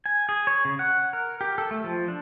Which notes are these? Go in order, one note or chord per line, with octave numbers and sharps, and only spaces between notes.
G#5
G#4
C#5
C#3
F#5
A#4
G4
A4
A3
F3
D4